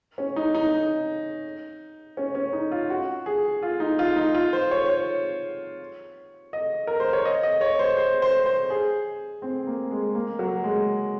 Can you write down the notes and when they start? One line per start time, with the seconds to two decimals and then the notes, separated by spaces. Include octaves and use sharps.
0.18 C#4
0.36 D#4
0.55 D#4
2.17 C#4
2.35 C#4
2.53 D#4
2.72 F4
2.90 F#4
3.26 G#4
3.63 F4
3.80 D#4
3.99 F4
4.16 D#4
4.35 F4
4.53 C5
4.71 C#5
4.89 C#5
6.53 D#5
6.87 A#4
7.00 C5
7.13 C#5
7.25 D#5
7.43 D#5
7.61 C#5
7.79 C5
7.97 C5
8.22 C5
8.46 C5
8.70 G#4
9.42 C4
9.67 A#3
9.91 G#3
10.15 A#3
10.39 F#3
10.64 G#3